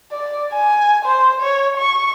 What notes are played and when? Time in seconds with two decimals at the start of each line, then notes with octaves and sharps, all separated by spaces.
0.12 D5
0.53 G#5
1.05 C5
1.41 C#5
1.77 C#6